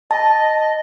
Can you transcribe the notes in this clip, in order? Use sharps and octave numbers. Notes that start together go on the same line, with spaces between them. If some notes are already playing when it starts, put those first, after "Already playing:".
D#5 A5